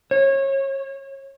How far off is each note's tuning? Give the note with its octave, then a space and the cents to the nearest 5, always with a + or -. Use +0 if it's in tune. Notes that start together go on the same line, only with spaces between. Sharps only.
C#5 -25